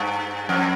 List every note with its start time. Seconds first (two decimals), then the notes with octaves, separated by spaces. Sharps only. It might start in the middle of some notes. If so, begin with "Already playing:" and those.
Already playing: G2
0.49 F2